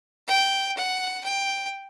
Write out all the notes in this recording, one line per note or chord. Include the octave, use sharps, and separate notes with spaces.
G5
F#5
G5